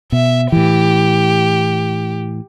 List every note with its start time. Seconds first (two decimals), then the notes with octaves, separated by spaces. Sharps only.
0.12 B2 E5
0.52 A2 E3 G4